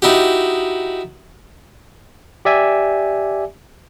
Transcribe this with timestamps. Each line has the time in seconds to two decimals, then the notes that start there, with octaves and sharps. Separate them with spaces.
0.02 D#4 E4 F#4 G4
2.45 G4 D5 E5 G#5